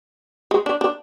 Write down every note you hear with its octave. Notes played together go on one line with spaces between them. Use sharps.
G#3
D4
D4